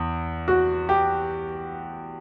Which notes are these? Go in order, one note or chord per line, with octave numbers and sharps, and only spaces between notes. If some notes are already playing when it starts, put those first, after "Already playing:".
Already playing: E2
F#4
G4